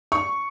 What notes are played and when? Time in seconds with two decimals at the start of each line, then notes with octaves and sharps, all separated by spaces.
0.12 C#6